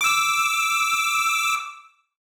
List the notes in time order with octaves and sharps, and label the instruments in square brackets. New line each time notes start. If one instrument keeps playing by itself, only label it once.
[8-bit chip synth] D6 E6